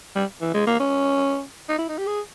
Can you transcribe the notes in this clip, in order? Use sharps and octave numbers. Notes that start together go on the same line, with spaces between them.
G3
E3
G#3
A#3
C#4
D#4
E4
D#4
G4
G#4